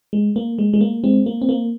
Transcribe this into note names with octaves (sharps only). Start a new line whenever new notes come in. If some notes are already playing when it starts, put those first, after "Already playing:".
G#3
A#3
G#3
G#3
A#3
G#3 C4
A#3
C4
A#3